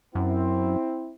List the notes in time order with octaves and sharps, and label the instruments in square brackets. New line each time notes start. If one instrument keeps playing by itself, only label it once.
[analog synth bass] F#2 [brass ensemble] C4 E4